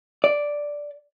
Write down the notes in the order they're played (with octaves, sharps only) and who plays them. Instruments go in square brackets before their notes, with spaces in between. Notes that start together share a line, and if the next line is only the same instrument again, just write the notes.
[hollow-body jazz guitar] D5